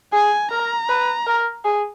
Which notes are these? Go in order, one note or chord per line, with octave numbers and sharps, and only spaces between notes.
G#4 G#5
A#4 A#5
B4
A#4
G#4